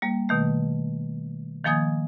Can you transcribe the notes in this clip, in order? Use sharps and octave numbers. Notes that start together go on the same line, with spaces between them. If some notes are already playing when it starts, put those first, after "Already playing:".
G3 A#3
B2 D#3 A3
D#3 F3 A#3 G#5 D#6 G#6